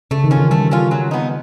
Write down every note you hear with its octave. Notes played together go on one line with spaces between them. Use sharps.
C#3 A3
D#3
C#4 F4
E3
G3 A3
C#4 F4
F#3
B3 D#4